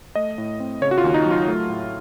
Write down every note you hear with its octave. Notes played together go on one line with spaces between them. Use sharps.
A3 D#5
A2
C4
C#3 C#5
F#4
F4
D#2
D#4
F#3
F4
A3
A2